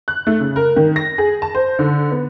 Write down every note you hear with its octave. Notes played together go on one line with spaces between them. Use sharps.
F#6
A3
C#3
A#4
D#3
A#6
G#4
A5
C5
D3
B3